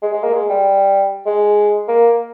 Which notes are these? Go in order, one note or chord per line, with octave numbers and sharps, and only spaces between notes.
G#3
G#3
A#3
G#3
G3
G#3
A#3